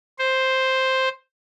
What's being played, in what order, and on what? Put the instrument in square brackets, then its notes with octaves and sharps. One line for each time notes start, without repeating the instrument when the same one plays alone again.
[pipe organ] C5